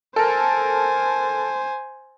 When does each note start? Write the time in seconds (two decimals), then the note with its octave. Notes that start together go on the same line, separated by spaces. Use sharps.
0.16 A4 A#4 C5 G#5